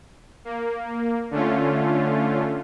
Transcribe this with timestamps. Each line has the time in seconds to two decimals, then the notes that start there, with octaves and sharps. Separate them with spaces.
0.45 A#3
1.31 D3 A3 C#4 F4